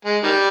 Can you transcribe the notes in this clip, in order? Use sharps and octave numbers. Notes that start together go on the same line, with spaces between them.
G#3
D#3 G3